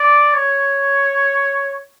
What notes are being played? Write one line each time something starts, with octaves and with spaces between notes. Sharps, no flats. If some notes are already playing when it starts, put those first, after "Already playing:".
Already playing: D5
C#5